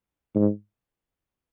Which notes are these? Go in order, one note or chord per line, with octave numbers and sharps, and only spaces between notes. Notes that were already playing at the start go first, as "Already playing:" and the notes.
G#2